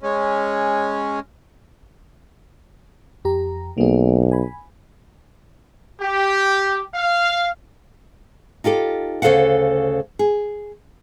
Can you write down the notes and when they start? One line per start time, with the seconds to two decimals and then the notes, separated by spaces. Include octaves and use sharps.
0.03 G#3 C#4
3.25 F2 G4 A#5
3.78 B1 A#3 G#4
4.32 G#5 B5
6.00 G4
6.94 F5
8.64 D#4 F4 G4 A4
9.22 D2 C#3 A4 C5 F5 F#5
10.19 G#4